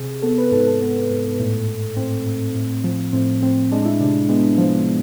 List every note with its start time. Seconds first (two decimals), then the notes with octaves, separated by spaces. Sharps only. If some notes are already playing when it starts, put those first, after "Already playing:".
Already playing: C3 G#4
0.22 B3 A4
0.38 B4
0.51 G#2 A4
0.67 A4
0.81 B3
1.10 G#2
1.40 A2
1.68 A2
1.96 A2 C4
2.26 A2
2.55 A2
2.84 F3
3.13 A2 C4
3.42 A2 C4
3.71 G#3 D4
3.82 D4
3.85 E4
4.00 C3 D4
4.29 G#3 B3
4.58 F3